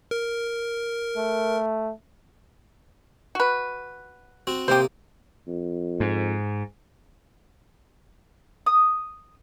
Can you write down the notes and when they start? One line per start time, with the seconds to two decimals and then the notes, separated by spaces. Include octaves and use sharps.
0.11 A#4
1.17 A3
3.35 F#4 B4
4.47 C4 F#4
4.68 C3 A#3 G4 C5 D#6
5.48 F2
6.00 G#2
8.66 D#6